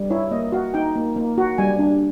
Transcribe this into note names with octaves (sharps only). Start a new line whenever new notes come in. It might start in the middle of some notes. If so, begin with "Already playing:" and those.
Already playing: G3
E4 C#5
A#3 D#5
F#4 F5
D#4 G5
A#3
A#3
F#4
G3 G#5
D4